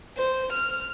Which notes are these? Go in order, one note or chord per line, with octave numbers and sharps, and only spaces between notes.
C5
F6